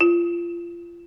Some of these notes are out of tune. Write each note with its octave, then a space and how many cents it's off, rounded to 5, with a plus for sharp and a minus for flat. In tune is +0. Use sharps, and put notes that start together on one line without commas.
F4 -25